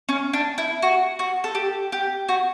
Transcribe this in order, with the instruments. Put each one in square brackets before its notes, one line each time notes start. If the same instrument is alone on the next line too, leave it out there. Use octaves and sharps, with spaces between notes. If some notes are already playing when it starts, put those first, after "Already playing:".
[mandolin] C#4
D4
E4
F#4
F#4
A4
G4
G4
F#4